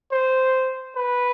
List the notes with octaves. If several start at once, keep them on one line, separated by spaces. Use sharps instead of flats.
C5
B4